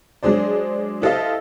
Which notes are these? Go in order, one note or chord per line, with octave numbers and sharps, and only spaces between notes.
F#3 G#3 D4 G#4 C5 D5
E4 G4 A4 C5 D#5 F5